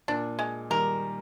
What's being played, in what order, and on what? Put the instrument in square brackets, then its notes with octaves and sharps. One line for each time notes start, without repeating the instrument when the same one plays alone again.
[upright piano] A#2 [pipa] D4
[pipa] G#3
[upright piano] D#3 G3 [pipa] A#4